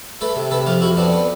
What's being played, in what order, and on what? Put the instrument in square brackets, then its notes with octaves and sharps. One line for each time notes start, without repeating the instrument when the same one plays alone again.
[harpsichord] A3 A4 B4
C3
C3 A4 B4
F3 F4 G4
F2 E4 F#4
B3 C4 D4
B3